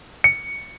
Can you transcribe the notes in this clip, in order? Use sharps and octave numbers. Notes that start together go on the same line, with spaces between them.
C#7